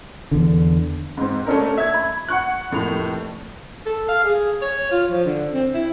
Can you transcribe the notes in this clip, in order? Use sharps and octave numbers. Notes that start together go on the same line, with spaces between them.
E2 D3
G#2 C4
A3 A#3 C#4 D4 A#4
E5 G#6
B5
F#5 C#6 F#6
F1 A2 A#3 B5 F7
A4
F5
G#4
C#5
F4
F3
D3
C4
E4